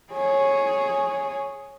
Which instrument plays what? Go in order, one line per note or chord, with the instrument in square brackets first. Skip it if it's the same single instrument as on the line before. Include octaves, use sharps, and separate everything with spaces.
[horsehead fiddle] G#4 C#5